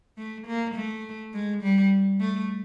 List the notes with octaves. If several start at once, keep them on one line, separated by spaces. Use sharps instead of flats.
A3
A#3
A3
G#3
G3
A3